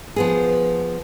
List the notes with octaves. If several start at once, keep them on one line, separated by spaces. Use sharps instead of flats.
F3 B3 G#4